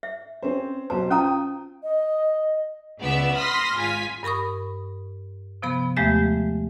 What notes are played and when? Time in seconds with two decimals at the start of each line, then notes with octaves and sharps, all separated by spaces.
0.03 E5
0.42 C4 C#4 C5
0.90 B1 C5 A5
1.10 C#4 F4 G5 A#5 D#6
1.83 D#5
3.00 C#2 C#3 B3 D5 E5 E6
3.35 B5 C6 D#6 F6 A#6 B6
3.76 G#1 F4 G#5 B6
4.23 G2 A#4 B5 C#6 D#6
5.63 C3 F3 B3 B5
5.97 D#2 F3 G#3 A3 G4 E5